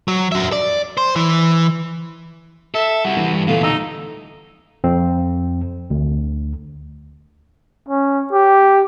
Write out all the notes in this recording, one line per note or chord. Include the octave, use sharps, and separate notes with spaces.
F#3
F#4 E5
D5
C5
E3
A4 E5
G3 E4 F#4
E3
G2 G3
D2 A#2 E3 A3 A4 F5
D#4 E6
F2 C4
D2
C#4
G4